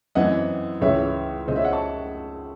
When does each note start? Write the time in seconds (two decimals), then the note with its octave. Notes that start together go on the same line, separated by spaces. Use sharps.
0.15 F#2 E3 C4 D#5 F#5
0.81 C#2 C#3 E3 G#3 C#5 E5
1.48 C#2 C#3 G#3 C5 D#5
1.56 C#5 E5
1.65 D#5 F#5
1.73 A5 C#6